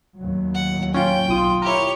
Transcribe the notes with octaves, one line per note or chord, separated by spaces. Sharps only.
D#2 A2 F#3
F#5
C#4 F4 G5
B1 F4 D#6
E4 G4 A#4 C#5